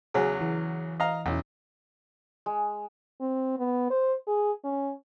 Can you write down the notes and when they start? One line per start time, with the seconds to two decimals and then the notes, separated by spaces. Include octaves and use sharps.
0.14 E2 C#3 F#3 G#4
0.41 E3
1.00 D#5 F5 A#5
1.26 B1 E2 C#4 E4
2.46 G#3
3.21 C4
3.58 B3
3.90 C5
4.27 G#4
4.64 C#4